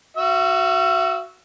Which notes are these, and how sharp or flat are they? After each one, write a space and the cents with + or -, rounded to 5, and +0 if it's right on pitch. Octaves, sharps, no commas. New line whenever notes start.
F#4 +0 E5 +45 E6 -20